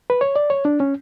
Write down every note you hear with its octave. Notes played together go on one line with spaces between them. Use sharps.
B4
C#5
D5
C#5
D4
C#4